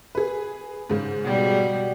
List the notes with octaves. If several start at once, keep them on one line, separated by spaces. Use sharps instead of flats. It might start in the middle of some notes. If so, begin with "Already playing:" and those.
G#4 B4
G#2 C#3
B2 G3